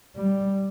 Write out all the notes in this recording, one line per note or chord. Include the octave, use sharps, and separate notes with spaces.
G3